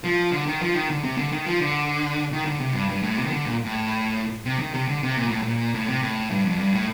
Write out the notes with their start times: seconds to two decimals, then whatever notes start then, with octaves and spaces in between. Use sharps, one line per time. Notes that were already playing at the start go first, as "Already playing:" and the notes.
0.04 F3
0.32 D3
0.47 D#3
0.61 F3
0.75 D#3
0.90 D3
1.04 C3
1.17 D3
1.32 D#3
1.46 F3
1.60 D3
2.32 D#3
2.46 D3
2.60 C3
2.74 G2
2.89 G2
3.03 A2
3.17 C3
3.25 D#3
3.31 D3
3.46 A#2
3.64 A2
4.45 C3
4.59 D#3
4.74 C3
4.88 D3
5.03 C3
5.17 A#2
5.29 A2
5.42 A#2
5.74 A2
5.87 C3
6.02 A2
6.31 G2
6.45 F2
6.59 G2
6.73 A2